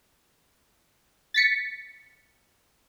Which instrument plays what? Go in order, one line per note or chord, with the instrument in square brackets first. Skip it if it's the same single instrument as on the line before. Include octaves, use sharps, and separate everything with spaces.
[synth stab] A6 B6 C#7